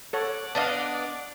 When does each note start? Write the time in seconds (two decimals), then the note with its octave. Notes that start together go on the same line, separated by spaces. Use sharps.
0.13 A4 C#5 F#5 D6
0.55 B3 D4 D#5 F5 A5